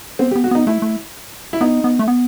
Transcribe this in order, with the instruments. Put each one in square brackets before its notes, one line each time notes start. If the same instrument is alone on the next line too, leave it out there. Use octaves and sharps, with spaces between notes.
[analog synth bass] B3 [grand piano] C4
[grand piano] G4
[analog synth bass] B3
[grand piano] F#4
[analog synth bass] B3 [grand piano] D#4
[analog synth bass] A3 [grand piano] E4
[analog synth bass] A3
[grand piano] E4
[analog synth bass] B3 [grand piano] D#4
[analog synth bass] B3
A3
B3